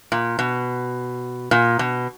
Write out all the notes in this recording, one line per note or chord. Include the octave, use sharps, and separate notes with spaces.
A#2
B2
A#2
B2